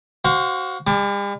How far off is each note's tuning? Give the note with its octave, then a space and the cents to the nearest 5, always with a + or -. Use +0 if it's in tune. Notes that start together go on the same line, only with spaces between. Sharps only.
F#4 +20 C5 +0 F5 +35
G3 +45 A5 +0 D6 +10